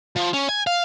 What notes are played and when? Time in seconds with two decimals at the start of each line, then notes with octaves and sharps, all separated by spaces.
0.17 F3
0.34 C#4
0.49 G#5
0.67 F5